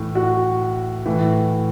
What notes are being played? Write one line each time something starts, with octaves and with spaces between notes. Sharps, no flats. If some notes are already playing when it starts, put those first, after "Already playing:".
Already playing: A2 E3
F#4
A2 E3